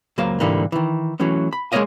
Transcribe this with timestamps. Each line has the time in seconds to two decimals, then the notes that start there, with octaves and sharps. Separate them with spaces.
0.18 C#2 F#3 A#3 C5 F5
0.40 C2 G#2 D3 E3 G3 A#3
0.72 D#3 E3
1.20 E3 F#3 A3 C#4
1.53 B5
1.72 G#3 A#3 A4 C#5 D#5 F5